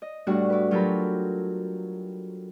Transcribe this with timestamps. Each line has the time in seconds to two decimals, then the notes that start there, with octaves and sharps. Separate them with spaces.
0.02 D#5
0.27 A2 G3 D4 F#4 F#5 F#6
0.50 E4 B4
0.71 F#3 F4 G4 A4 A#4 B5